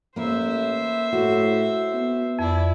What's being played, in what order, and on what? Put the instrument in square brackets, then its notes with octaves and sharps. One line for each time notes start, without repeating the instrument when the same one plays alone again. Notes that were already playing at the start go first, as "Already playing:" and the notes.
[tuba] A1 [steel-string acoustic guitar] A#3 E4 [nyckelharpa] C5 E5
[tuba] A2 [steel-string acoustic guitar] F#4
[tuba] B3
[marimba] F2 [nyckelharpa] E4 D5